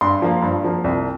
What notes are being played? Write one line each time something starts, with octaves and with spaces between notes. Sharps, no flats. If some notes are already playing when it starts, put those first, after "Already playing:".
G2 C6
F3 A#3
G2
F3 A#3
C2